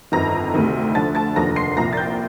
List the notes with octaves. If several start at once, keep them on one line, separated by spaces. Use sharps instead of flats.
G1 F2 D#3 A#5 A#6
D2 C3 D#3
D2 D3 F3 A5 A6
A5 A6
F1 D#2 D3 F3 A#5 A#6
C6 C7
C2 A#2 F3 A#5 A#6
A6
G5 G6